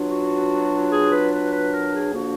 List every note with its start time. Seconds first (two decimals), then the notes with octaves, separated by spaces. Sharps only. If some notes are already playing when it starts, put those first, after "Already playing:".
Already playing: B2 F#3 D4 F4
0.09 F#4
0.90 G#4
1.11 B4
1.31 B4
1.52 B4
1.72 A#4
1.93 G#4
2.13 D3 F3 A#3 D4 F#4